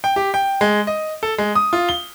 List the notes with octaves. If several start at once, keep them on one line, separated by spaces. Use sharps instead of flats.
G5
G4
G5
G#3
D#5
A4
G#3
D#6
F4
G7